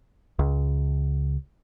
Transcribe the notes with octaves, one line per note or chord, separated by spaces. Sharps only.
C#2